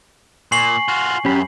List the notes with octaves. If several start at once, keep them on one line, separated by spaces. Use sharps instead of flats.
A#2 G#5 C#6 C7 F#7
F4 F#4
C2 F#2 C#4 G4 B5